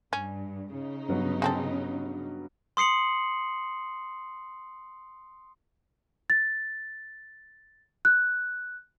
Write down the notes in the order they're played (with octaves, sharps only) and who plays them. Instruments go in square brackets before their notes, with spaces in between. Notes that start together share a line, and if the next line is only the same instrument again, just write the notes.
[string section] G2 [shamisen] C#4
[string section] C#3 D#4
[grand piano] G2 F#3 B3
[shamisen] G#3 C4 A4
[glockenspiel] C6 D#6 C7 C#7 F#7
[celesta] A6
F#6